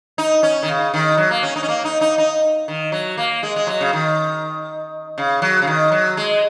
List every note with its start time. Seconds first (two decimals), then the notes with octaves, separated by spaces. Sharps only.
0.18 D#4
0.43 C#4
0.63 D#3
0.68 C#3
0.94 D#3
1.17 F#3
1.31 A#3
1.43 C#4
1.56 D#4
1.63 C#4
1.68 A#3
1.85 D#4
2.01 D#4
2.18 D#4
2.68 D#3
2.92 F#3
3.17 A#3
3.43 G#3
3.56 G#3
3.67 F#3
3.81 C#3
3.93 D#3
5.18 C#3
5.42 F#3
5.62 C#3
5.67 D#3
5.92 F#3
6.17 G#3